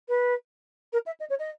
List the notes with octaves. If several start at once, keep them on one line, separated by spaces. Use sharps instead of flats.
B4
A#4
E5
D#5
C#5
D#5